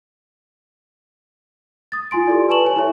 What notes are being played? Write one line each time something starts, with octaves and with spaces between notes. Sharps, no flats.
D#6 A6
E4 F4 G#5 C6 D7
G4 A4 D5
B4 G#5 A5 C#6 E7 F#7
C#5 G#5
E4 A4 C#5 E5